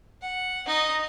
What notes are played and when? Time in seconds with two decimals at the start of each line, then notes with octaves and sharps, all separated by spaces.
0.22 F#5
0.66 D#4 D#5